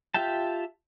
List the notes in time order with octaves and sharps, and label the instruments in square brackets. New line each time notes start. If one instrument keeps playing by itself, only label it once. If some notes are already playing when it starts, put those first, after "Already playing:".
[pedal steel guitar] F4 G4 E5 G5 A5